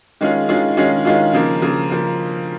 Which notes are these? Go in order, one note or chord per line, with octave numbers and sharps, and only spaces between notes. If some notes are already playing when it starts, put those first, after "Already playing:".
D#3 G#3 C#4 F4 G#4
D#3 G#3 C#4 F4 G#4
D#3 G#3 C#4 F4 G#4
D#3 G#3 C#4 F4 G#4
C#3 F3 A#3
C#3 F3 A#3
C#3 F3 A#3